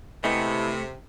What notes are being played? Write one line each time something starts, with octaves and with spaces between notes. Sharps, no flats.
C3 G#3 A3 B3 E4